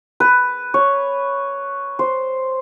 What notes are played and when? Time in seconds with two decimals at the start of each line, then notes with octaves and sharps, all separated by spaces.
0.20 B4
0.74 C#5
1.99 C5